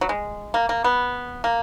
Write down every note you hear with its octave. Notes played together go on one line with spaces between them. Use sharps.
F#3
G#3
A#3
A#3
B3
A#3